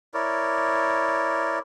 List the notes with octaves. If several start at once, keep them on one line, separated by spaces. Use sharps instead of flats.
E4 A#4 C#5 D5